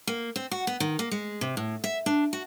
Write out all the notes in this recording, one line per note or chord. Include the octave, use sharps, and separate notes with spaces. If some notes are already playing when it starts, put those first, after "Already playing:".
A#3
C4
F#4
B3
D#3
A#3
G#3
C3
A2
E5
D4
F#4